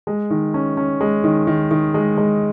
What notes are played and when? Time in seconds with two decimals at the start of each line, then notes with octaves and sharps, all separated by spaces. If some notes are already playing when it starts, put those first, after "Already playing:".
0.07 G#3
0.30 D#3
0.54 C#4
0.77 C#4
1.01 G#3
1.24 D#3
1.47 D#3
1.71 D#3
1.94 G#3
2.17 G#3